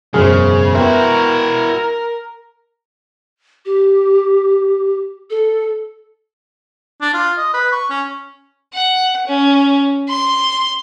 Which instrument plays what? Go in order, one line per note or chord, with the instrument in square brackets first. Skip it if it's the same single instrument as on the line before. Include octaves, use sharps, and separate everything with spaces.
[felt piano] E1 F#2 F6 [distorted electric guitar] C#3 [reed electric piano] G#4 C5
[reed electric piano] B3 G5 C6 [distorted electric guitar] E4 F#4 [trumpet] A#4 [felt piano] E5
[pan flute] G4
A4
[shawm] D4
F4
D#5
B4
C#6
C#4
[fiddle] F#5
C#4
C6